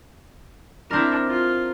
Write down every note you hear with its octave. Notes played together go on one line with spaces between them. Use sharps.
C4 D4 E4 A#4
F4